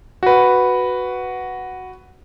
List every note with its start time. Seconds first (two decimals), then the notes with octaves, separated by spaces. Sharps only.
0.23 F#4 B4